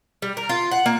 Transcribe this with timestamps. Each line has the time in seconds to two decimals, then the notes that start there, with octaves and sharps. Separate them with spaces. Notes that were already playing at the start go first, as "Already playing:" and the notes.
0.22 G3
0.37 A#4
0.49 F4
0.72 F#5
0.86 A#3